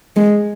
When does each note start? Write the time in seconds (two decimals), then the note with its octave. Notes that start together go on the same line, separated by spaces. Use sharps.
0.17 G#3